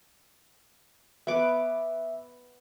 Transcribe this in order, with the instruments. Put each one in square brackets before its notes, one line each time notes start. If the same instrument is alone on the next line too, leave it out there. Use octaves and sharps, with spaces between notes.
[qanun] B3 D6 [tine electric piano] E5